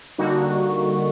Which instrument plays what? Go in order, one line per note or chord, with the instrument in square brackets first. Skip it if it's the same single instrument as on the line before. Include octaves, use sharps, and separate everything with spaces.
[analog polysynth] D3 G3 A#3 D#4 F#4